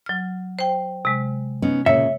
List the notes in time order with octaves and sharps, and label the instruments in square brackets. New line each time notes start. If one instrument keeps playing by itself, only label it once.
[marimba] F#3 F6
C5 G5
C3 G#3
[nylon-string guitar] B3 C#4 D#4
[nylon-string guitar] A#2 C#3 [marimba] C#5 [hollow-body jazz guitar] E5